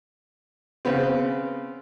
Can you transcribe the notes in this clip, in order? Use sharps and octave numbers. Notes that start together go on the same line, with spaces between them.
C#3 B3 C4